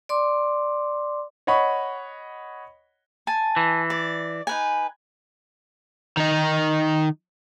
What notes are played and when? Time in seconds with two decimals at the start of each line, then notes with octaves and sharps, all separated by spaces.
0.09 D5 C6 D6
1.47 C#5 D#5 F#5 B5 C#6
3.27 G#5 A5
3.56 E3
3.90 D5
4.47 D#4 B4 G#5
6.17 D#3 D#4